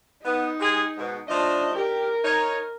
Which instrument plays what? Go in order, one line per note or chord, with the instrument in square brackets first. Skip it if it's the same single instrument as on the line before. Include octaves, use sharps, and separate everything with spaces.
[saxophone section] B3 [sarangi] D#4
[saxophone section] G#3 G4 G#4
G#2 B2
[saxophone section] F3 A3 D#5 [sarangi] D4
[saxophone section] G4 [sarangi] A#4
[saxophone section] D#4 C#5